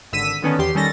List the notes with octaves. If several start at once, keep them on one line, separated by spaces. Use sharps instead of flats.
G#1 D3 E6 B6 D#7
D3 D#3 B3 C#4 D4
E2 G4 C6
D#3 G3 C#4 A4 A6 A#6